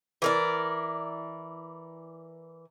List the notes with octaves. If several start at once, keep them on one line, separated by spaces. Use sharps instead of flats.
E3 A#4 D5